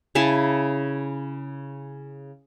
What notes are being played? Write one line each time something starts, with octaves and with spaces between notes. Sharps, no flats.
C#3 E4 G#5 A5